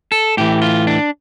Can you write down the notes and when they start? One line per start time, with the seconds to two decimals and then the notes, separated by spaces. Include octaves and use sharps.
0.12 A4
0.37 A2 E3 G4
0.62 F4
0.87 D4